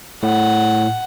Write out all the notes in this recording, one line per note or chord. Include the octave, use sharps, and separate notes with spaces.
A2 F#5